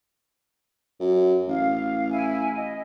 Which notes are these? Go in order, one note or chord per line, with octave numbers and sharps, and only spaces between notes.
F#2
A1 F5
E4 G#5
D#5